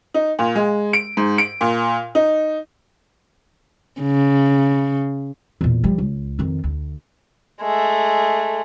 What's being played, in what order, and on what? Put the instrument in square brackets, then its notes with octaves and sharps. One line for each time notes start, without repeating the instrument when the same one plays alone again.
[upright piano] D#4
A#2
G#3
D7
G#2
D7
A#2
D#4
[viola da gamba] C#3
[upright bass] E2 A#2
F3 G3
C#2
F2 D#3
D2
[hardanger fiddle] G#3 A3